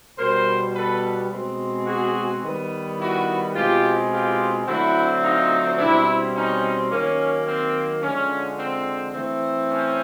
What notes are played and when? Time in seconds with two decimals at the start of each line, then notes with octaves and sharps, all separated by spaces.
0.19 B2 G3 B3 A#4 C5
0.75 A4 B4
1.31 B2 G#3 C4
1.86 F#4 G#4
2.43 D#3 G3 B3
2.98 E4 F#4
3.54 B2 G#3 C4 F4 G4
4.11 F4 G4
4.66 D3 F#3 A3 C4 E4 F#4
5.22 D#4 F4
5.78 B2 G3 C4 D4 E4
6.34 C#4 D#4
6.90 D#3 F#3 A#3 C#4
7.46 C4
8.03 D3 F3 G#3 C#4
8.58 C4
9.14 E3 A3 C4
9.71 C#4